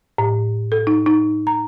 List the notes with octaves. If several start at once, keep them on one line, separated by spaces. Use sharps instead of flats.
A2
A4
D#4
D#4
A#5